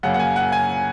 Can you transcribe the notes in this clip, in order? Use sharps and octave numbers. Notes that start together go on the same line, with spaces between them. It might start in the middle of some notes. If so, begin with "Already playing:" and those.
F#2 C#3 A#3 F#5
F#5
G#5
F#5
G#5